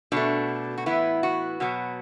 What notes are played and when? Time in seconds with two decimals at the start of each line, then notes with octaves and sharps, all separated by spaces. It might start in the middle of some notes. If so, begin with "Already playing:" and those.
0.12 B2 A3 D4
0.78 F#4
0.86 A2 E3 B3 E4
1.23 F#4
1.60 B2 F#3 B3